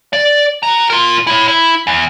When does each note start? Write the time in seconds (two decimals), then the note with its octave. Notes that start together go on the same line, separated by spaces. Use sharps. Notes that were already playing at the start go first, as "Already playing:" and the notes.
0.13 D5
0.63 F#4 A#5
0.90 F4 A#4
1.27 E4 C#5
1.48 E4
1.87 E2